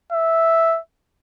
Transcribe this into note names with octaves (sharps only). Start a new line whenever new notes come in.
E5